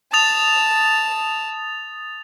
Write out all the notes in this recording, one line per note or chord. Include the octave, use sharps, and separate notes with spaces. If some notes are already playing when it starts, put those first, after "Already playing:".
A5 D#6 A6 F7